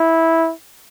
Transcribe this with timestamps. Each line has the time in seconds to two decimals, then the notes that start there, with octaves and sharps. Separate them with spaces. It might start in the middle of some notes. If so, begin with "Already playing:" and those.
Already playing: E4